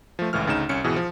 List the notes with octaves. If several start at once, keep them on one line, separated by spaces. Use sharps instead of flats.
F3 A3
G#1 C#2 A2 E3 F6
D2 C#3 D#4 E7
C2 C#4 C#7
G#1 B2 E3 G#4
F3